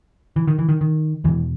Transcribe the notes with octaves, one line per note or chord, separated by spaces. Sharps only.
E3
D#3
E3
D#3
D#3
E2 B2 E3